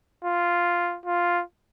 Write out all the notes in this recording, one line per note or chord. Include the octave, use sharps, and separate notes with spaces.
F4
F4